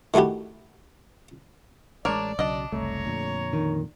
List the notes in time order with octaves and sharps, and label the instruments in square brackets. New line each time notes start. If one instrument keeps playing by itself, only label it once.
[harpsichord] D#3 A3 E4 F#4 G4
[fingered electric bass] A1 G#3 [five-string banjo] D4 A#4 C#5 [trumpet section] D5
[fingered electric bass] B1 C#3 F#3 [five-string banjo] D4 D#5
[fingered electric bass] F#1 C2 [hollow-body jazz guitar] A3 [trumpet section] C#5 A#5
[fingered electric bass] F2 A#2 D3
[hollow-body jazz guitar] D#3